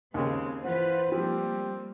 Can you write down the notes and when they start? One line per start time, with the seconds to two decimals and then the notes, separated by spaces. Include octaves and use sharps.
0.14 D#2 C#3 G#3 C4
0.64 E3 F4 B4 C5 F#5
1.12 F3 G3 A#3 C4 G4